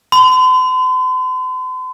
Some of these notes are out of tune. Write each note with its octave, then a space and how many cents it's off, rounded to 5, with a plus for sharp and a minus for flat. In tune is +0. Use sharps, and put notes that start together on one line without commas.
C6 -45